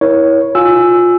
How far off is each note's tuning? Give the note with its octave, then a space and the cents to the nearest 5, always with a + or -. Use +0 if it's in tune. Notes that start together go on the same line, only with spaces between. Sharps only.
E4 -15 A#4 +40 C#5 +0
F4 +20 G#5 +0 E6 +0